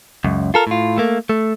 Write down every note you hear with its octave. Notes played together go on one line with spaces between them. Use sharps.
C#2 F#2
F4 A4 A#4
A2 F4
A3 A#3
A3